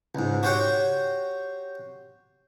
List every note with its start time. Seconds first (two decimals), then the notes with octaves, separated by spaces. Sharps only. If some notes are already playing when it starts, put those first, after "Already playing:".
0.15 C#2 G#2
0.43 F#4 G4 C5 C#5 F#5 G5